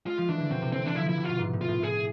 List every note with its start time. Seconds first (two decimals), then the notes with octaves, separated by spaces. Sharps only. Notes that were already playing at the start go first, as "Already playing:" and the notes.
0.06 G#3 F4
0.18 F3
0.28 E3 D4
0.40 D3
0.50 B2 C4
0.62 C3
0.72 D3 C4
0.84 E3 D4
0.95 F3 E4
1.05 F3 E4
1.17 C3
1.24 B2 F4
1.39 G#2
1.53 A2
1.61 F4
1.68 A2
1.82 A2 G#4